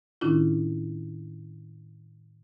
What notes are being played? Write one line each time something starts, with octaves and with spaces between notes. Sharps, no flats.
A2 D#3 C#4 D4 E4 F4